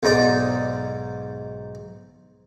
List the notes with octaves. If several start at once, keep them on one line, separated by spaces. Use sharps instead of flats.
B1 G#2 D#4 D5